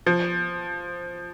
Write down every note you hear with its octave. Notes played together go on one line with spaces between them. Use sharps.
F3